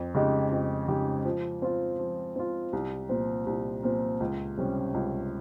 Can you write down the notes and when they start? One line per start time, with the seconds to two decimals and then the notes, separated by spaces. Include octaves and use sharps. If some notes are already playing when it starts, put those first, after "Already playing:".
Already playing: F2
0.14 C#3 G#3 D#4 G4
0.51 F2
0.88 C#3 G#3 D#4 G4
1.25 F3
1.62 C4 F4
1.99 F3
2.36 C4 F4
2.73 C2
3.09 A#2 F3 C4
3.46 C2
3.83 A#2 F3 C4
4.20 C#2
4.57 C3 G3 C#4
4.94 C#2